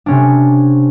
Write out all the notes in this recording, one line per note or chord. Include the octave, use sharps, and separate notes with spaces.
C3 C#4 D4